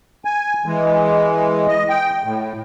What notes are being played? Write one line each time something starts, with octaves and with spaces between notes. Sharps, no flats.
G#5
E3 G#3
D#5
G5
A2